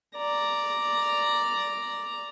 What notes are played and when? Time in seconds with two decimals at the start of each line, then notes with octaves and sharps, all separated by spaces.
0.17 D5 A#5